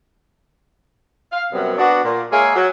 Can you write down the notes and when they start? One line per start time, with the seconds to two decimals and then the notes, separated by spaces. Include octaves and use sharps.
1.32 F5
1.52 F#2 C3 F#3 G3 B3
1.78 B3 D4 F#4
2.04 A#2
2.32 G#3 A#3 G#4 C#5 E5
2.55 F#3